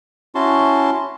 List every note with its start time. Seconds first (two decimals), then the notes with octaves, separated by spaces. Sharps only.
0.35 C#4 E4 F#4 A5 C6